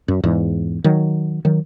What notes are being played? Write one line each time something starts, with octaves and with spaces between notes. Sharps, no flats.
F#2
E2 G#2
D#3 F#3
D#3 F#3